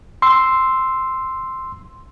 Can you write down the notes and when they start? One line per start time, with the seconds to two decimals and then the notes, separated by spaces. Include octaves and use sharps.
0.22 C6 E6